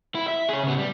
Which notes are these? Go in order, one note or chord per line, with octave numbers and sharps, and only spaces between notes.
E4
E5
G#4 C#5
C#3 B3
G3